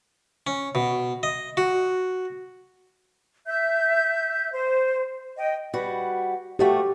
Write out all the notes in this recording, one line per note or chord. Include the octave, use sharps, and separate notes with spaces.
C#4
B2
D#5
F#4
E5 G6
C5
D#5 G5
G3 F#4 B4
F3 A3 F#4 G4